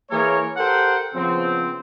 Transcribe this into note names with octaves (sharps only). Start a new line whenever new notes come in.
E3 A#3 G#4 A#4 C#5
G4 A4 A#4 C5 F#5 G5
C#3 F3 B3 C4